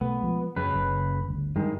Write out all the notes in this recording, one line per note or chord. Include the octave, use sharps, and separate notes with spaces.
B1 A3 B3
F3 G#3
F#2 C#3 B4
F#1
G1 D2
G2 D#3 G#3